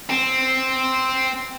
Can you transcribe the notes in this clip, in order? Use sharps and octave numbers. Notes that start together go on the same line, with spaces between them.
C4